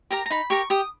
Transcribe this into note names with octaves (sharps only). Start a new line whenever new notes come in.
G4 A#4 A#5
A#5
D#4 B5
G4 A#4 C#6
G4 D#6